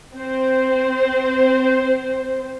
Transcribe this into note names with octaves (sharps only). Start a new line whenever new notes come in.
C4 C5